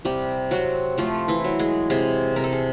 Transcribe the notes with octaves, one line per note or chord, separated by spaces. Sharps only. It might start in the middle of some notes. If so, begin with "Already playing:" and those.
C3 G3 G4
F#3 C4 F#4
F3 A3 F4
E3 E4
F#3
G#3 G#4
C3 G#3 G#4
C3 A#4
A4
G#4